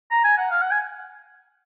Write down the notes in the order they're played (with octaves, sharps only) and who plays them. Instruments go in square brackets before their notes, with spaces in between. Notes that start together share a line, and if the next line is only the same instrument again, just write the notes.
[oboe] A#5
G#5
F#5
F5
F#5
G#5